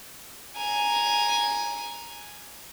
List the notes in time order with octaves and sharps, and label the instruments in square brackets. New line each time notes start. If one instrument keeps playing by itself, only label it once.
[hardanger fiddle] G#5 A#5